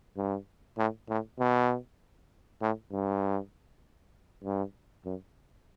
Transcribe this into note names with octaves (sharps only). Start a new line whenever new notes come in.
G2
A2
A2
B2
A2
G2
G2
F#2